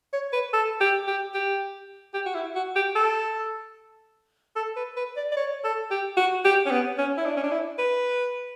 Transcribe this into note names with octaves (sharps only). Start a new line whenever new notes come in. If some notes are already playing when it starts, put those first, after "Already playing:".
C#5
B4
A4
G4
G4
G4
G4
F#4
E4
F#4
G4
A4
A4
B4
B4
D5
D5
C#5
A4
G4
F#4
G4
C#4
B3
C#4
E4
D4
C#4
D4
E4
B4